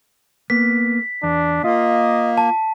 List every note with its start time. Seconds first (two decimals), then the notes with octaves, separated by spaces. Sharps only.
0.50 A#3 B3 B6
1.23 E2 D4
1.64 A#3 F4 D#5
2.37 A5